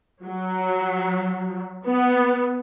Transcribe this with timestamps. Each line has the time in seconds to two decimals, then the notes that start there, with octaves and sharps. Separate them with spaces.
0.25 F#3
1.85 B3